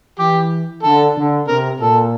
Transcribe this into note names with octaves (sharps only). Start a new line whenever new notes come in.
E3 G4
D3 A4
D3
C3 A#4
A#2 A4